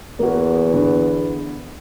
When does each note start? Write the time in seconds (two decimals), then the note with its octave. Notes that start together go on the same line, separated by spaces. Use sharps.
0.19 E2 A#3 F#4
0.73 D3 B3